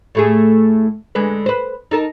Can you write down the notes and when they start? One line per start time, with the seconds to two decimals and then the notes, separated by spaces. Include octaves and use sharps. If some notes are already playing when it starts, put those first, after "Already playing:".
0.15 A2 A3 G#4
1.15 D3 G#3 B4
1.46 B4 C5
1.91 D#4 A4 A#4